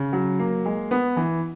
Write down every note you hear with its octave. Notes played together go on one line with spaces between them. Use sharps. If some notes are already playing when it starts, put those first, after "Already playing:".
Already playing: C#3
F#3
A#3
G#3
B3
E3